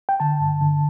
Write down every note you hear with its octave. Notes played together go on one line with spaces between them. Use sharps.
G5
D3 A5
G2
D3